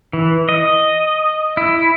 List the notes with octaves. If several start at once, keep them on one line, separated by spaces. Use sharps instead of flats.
E3
D#5
E4